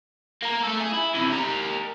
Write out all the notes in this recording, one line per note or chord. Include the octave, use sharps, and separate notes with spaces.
A#3 A#4
A3 A4
G#4
E4
C3 E3
G4 A#4